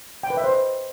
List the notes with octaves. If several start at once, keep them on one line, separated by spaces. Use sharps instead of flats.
G5
B4
E5
C5
D#5